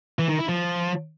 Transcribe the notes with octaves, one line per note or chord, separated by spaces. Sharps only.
E3
D#3
E4
F3